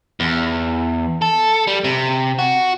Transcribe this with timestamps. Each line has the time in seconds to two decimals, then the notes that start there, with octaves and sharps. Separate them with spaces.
0.20 E2
1.22 A4
1.67 G3
1.84 C3
2.39 F#4